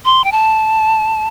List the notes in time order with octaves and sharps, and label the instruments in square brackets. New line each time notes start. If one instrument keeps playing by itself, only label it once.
[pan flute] C6
G5
A5